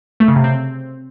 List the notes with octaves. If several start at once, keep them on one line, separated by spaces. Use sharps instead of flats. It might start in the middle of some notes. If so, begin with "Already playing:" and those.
A3
C#3
C3
C4